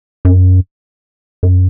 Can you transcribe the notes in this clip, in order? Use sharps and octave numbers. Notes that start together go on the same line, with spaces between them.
F#2
F#2